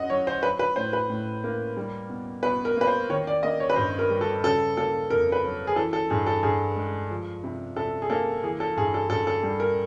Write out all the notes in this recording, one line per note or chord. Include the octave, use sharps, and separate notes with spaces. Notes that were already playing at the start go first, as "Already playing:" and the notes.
Already playing: F#2 D#5 F#5
F#3 C#5
C5
F#3 B4
B4
A2 C5
B4
A2
A#3
G3
B2
B2 B4
A#4
A#3 B4
C5
D#3 C#5
D5
A#3 D#5
C#5
B4
G2 C5
A#4
G3
A4
C#3 A4
A#3 A4
F2 A#4
B4
F#3
G#4
E3 A4
A4
G2 G#4
A4
G2 G#4
G#3
F3
C3
C3 A4
G#4
A#3 A4
E3 G#4
A4
G2 G#4
A4
G2 A4
A4
G3
A#4